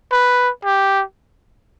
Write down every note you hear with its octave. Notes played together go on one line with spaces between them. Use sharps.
B4
G4